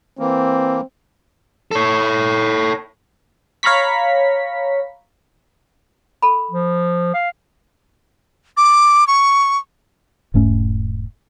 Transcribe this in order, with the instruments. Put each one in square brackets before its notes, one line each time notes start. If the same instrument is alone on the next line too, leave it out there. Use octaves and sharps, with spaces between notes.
[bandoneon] E3 A#3 [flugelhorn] C4
[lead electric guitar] A4 C#5
[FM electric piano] C#5 F5 A#5 B5 C#6 B6
[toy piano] A4 B5
[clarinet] F3
F5
[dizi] D6
C#6
[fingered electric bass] E1 G#2 A3 C#4